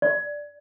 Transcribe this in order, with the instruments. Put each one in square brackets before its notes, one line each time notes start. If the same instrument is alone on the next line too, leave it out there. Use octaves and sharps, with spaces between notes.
[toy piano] D5